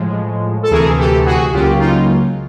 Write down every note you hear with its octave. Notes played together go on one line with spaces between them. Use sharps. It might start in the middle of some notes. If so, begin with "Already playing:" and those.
Already playing: A2 F3 G#3
A4
D2 C3 E3 A3 G#4 A#4
G4 A4
F#4 G#4
C#2 C#3 F#3 A#3 F4 G4
D#4 F4